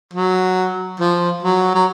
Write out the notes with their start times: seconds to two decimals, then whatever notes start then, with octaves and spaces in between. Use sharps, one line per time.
0.13 F#3
1.00 F3
1.42 F#3
1.75 F#3